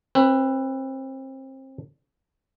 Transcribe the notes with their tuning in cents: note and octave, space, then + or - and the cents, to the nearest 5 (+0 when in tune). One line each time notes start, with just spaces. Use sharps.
C4 +30 B4 +0